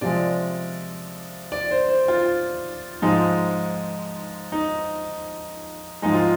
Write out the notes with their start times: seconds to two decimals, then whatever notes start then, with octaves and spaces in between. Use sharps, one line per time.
0.01 C3 F3 G#3 D5
1.52 D5
1.71 C5
1.89 C5
2.08 F4
3.02 G#2 F3 G#3 D#4
4.52 D#4
6.02 G#2 F3 G#3 D#4
6.14 F4